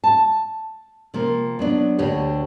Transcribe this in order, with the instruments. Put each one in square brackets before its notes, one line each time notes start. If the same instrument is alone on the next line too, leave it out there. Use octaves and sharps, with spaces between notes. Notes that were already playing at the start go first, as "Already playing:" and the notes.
[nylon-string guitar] A5
C3 F3 A#3
F#3 B3 D4
D2 D3 G4 C#5